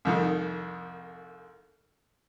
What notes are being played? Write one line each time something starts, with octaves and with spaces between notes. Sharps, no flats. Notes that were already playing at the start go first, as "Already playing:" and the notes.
C2 F2 D#3